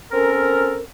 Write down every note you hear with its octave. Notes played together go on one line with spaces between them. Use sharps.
C4 C#4 A4 A#4